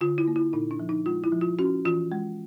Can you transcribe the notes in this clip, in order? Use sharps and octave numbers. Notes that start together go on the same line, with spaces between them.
D3 F4
E4
A#3
E4
A#2 D#4
D4
F3
D#4
G#3 F4
E4
F3
F4
C#4 F#4
E3 F4
G#3